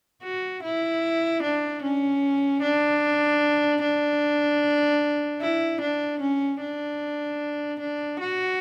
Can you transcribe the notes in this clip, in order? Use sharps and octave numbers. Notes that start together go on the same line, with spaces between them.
F#4
E4
D4
C#4
D4
D4
E4
D4
C#4
D4
D4
F#4